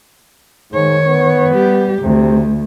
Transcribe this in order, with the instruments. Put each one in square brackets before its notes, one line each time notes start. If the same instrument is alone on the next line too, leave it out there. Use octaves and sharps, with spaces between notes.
[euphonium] G#2 [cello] D#3 C#5
[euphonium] B3
[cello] G3 G4
[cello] D2 [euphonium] C3